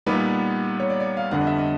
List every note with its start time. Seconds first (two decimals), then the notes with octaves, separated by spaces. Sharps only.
0.06 A#2 G3 B3 D#4 B4
0.80 C#5
0.90 D5
1.00 D5
1.17 F5
1.31 F2 D3 G3 B3 D4 F#5
1.41 D#5
1.47 E5
1.58 D#5